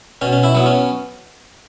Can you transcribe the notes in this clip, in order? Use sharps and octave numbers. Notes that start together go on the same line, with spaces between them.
B2 C#4
C#4
E4
F#3 B3
C#4